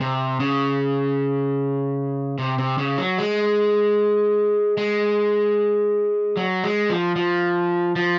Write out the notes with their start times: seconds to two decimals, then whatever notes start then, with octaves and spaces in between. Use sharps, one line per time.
0.01 C3
0.40 C#3
2.38 C3
2.58 C3
2.78 C#3
2.98 F#3
3.18 G#3
4.77 G#3
6.37 F#3
6.64 G#3
6.90 F3
7.16 F3
7.96 F3